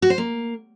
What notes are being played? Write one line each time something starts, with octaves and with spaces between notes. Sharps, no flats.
F#4
C5
A#3